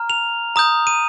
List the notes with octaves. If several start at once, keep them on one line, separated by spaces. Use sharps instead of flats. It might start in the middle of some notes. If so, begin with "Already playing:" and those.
Already playing: A#5 F6
F7
A#5 D#6 G6
D#7